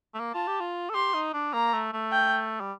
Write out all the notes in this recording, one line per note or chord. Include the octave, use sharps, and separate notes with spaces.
A3
A#3
F4 A5
G4
F4
A4
G4 C6
D#4
D4
A#3 A#5
A3
A3
G5
G3